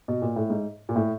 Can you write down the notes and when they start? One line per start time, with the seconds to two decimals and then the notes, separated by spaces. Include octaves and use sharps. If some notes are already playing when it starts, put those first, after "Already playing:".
0.08 B2
0.22 A#2
0.36 A2
0.50 G#2
0.89 A#2
0.96 A2